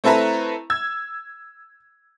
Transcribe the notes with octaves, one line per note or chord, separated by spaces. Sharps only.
A3 C4 E4 A4 B4 A#5
E6 G#6